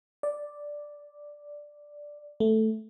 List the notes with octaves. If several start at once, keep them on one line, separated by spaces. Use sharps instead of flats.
D5
A3